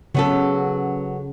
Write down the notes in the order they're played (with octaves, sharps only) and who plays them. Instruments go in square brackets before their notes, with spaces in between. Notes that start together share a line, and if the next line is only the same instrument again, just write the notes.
[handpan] C#3 [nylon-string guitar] F#3 B3 A4